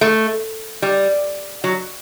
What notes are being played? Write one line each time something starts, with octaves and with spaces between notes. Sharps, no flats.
A3
G3
F#3